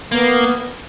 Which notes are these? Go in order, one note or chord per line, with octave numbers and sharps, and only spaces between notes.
A#3 B3